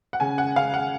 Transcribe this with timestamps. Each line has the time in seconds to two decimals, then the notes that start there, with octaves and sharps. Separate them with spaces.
0.13 F#5
0.20 C#3 G#5
0.38 F#5
0.56 C#3 F5
0.74 F#5